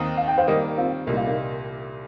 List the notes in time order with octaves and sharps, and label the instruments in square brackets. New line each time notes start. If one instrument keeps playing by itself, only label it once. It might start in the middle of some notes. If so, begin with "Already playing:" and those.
Already playing: [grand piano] D#2 D#3 C4 D#4
[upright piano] F5
G5
C5 F5
[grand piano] D#3 G3 A#3 [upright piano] A#4 D#5
[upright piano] C4 F4
[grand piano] C2 A#2 G3 [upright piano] A#3 D#4
[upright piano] F4
A#3 D#4